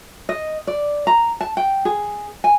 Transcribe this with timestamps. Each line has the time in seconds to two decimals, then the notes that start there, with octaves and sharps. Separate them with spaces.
0.29 D#5
0.67 D5
1.07 A#5
1.41 A5
1.57 G5
1.85 G#4
2.44 G#5